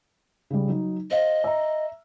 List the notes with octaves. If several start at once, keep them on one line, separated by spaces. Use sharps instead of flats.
C#3 G3
F#3 D#4
C5 D#5 F5
E5 A#5